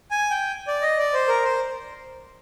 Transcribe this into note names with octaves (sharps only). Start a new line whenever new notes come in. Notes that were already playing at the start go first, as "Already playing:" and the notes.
G#5
G5
D5
D#5
D5
C5
A#4
C5